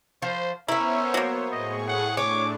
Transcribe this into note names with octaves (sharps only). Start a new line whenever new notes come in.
F3 C5
B3 C#4 E4 A#4 C5 C#5 E5
F#3 A#3
A2 G#4 D#5 C#6
F#5
A2 D4 C#5 D6